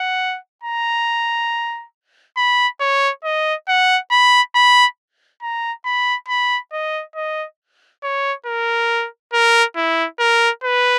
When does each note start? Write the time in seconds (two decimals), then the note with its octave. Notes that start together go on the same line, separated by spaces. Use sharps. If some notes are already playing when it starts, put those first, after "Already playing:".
Already playing: F#5
0.64 A#5
2.37 B5
2.81 C#5
3.24 D#5
3.68 F#5
4.11 B5
4.55 B5
5.42 A#5
5.85 B5
6.29 B5
6.73 D#5
7.16 D#5
8.03 C#5
8.46 A#4
9.34 A#4
9.76 E4
10.20 A#4
10.64 B4